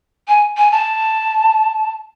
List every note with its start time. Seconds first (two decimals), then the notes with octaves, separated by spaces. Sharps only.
0.28 G#5
0.57 G#5
0.72 A5